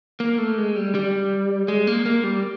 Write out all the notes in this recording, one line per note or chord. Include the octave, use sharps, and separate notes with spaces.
A#3
A3
G#3
G3
G3
G#3
A#3
A#3
G3